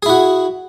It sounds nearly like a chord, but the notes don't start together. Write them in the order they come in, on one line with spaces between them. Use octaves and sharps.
G#4 E4 F#4